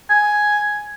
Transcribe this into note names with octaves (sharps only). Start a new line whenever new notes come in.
G#5